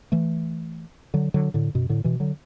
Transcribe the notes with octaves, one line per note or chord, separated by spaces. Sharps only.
E3 A3
D3 F#3
D3 F#3
A2 D3
F#2 B2
A2 D3
B2 E3
D3 F#3